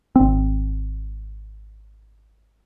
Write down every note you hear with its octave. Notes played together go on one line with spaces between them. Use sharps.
G#1 C4